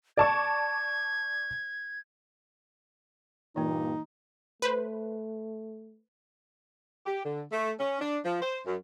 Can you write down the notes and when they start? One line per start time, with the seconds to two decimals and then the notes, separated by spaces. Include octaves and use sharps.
0.17 D5 A5 C#6 G#6
3.56 G2 A#2 E3 A#3 D#4
4.62 A3 B4 C5
7.06 G4
7.25 D3
7.52 A3
7.79 C#4
8.01 D4
8.25 F3
8.42 C5
8.66 F#2